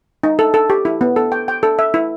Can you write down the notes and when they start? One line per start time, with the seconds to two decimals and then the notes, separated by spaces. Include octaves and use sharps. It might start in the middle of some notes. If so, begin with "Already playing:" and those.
0.24 D#4
0.39 A4
0.54 A4
0.70 G4
0.85 E4
1.01 B3
1.16 A4
1.32 G5
1.48 G5
1.63 A4
1.79 E5
1.94 E4